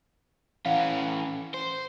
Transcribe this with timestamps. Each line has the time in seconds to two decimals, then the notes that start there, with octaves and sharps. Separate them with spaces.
0.66 E3 C#4 F5 F#5
1.54 C5